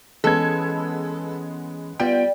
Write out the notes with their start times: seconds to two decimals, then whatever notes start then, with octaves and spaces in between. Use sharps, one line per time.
0.24 E3 G#3 B3 C#4 A4 G#6
2.00 G3 B3 F4 G5